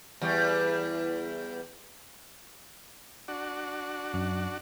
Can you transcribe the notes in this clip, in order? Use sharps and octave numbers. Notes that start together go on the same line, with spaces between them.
E2 G3
D4 F#4
F#2